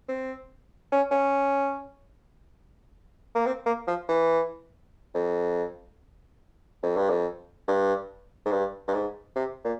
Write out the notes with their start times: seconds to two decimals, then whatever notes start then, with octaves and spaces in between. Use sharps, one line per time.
0.09 C4
0.92 C#4
1.11 C#4
3.35 A#3
3.46 C4
3.66 A#3
3.88 F3
4.09 E3
5.15 F2
6.83 F2
6.97 G2
7.10 F2
7.68 G2
8.46 G#2
8.52 G2
8.88 G2
8.94 G#2
9.36 C3
9.65 A#2